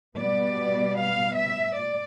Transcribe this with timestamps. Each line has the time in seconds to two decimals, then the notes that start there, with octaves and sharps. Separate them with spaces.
0.16 B2 G3 B3 D5
0.96 F5
1.36 E5
1.76 D5